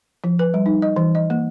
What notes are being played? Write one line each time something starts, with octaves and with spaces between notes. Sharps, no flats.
F3
B4
G3
D#4
D#5
E3
D#5
A#3